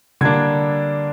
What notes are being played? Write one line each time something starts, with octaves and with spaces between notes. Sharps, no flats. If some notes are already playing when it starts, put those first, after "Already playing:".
D3 G3 A#3 D4 G#6